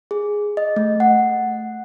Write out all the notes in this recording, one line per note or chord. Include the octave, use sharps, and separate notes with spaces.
G#4
D#5
A3
F#5